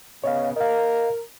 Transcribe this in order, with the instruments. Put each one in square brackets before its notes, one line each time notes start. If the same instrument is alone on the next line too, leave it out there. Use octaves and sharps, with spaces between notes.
[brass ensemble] C#3 B3 [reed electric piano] C#5 D#5 F5
[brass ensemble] A#4 [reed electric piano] D#5 F5